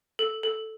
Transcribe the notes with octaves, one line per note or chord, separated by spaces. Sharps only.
A4
A4